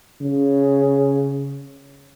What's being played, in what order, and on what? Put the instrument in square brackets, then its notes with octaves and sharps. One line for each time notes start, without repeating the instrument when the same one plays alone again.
[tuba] C#3